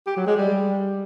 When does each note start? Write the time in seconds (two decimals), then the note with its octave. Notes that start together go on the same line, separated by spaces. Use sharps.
0.07 G4
0.17 F#3
0.27 G#3
0.37 G3